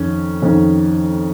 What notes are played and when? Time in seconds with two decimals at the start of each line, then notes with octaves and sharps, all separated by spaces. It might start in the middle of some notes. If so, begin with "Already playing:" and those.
Already playing: F2 D#3 C#4
0.42 F2 D#3 C#4